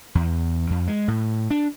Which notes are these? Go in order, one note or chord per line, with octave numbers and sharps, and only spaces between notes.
E2
F2
G#3
A2
D4